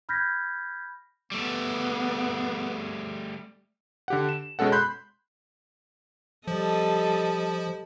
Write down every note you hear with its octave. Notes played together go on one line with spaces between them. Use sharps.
B5 F6 G6 G#6 A#6 B6
G3 A3 B3
D3 G4 F#5
E7
B2 G#3 C#4 A4 F#5
B5 C6 F#6 G6
F3 G3 A4 D#5